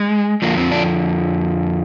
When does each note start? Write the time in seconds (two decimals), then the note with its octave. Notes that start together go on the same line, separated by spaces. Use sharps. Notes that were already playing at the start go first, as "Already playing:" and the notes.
Already playing: G#3
0.42 F2 D3 F3 A#3
0.57 C4
0.71 D4